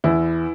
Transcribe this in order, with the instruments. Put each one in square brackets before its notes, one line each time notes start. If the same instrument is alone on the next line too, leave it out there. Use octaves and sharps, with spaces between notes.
[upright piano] E2 E4